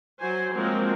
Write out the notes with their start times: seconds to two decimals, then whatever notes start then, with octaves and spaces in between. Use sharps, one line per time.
0.20 F#3 C5 G#5
0.54 F3 F#3 G#3 A#3 C4 A#4